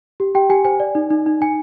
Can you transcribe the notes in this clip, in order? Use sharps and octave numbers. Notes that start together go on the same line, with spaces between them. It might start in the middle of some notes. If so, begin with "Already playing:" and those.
G4
G4 G5
G4 G#5
C5 G#5
D5
D#4
D#4
D#4
D#4 G#5